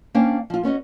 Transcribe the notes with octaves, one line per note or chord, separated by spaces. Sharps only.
A#3 C#4 D4 C5 F5 G5
F3 F4
B3 C#4 F#4 D#5